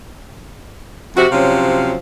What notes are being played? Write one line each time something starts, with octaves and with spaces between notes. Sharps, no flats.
F2 C3 F#4
C3 F3 F#3 C#4 F5